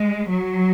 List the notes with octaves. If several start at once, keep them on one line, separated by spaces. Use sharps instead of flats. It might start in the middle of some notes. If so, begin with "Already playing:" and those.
Already playing: G#3
F#3